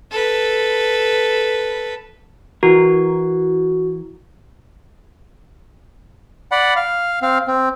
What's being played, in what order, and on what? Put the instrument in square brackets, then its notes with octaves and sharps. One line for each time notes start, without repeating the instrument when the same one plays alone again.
[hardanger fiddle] A4 B4
[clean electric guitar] E3 A#4 [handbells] F#4
[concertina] D5 F#5 B5
F5
C4 F5
C4